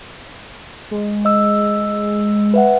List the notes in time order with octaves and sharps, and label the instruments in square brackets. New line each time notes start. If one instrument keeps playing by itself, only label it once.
[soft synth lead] G#3
[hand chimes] D#5 E6
B4 E5 F#5